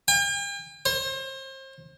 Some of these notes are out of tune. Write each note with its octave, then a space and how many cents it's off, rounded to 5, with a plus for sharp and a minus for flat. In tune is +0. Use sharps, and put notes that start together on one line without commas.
G5 +45
C5 +35